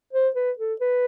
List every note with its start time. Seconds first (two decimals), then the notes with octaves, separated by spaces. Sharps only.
0.13 C5
0.35 B4
0.59 A4
0.81 B4